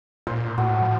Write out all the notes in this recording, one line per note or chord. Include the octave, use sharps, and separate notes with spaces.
A#2 C5
A2 F#4
F3